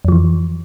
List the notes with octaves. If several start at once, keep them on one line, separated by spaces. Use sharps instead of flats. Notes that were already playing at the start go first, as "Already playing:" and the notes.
F2 E3 F3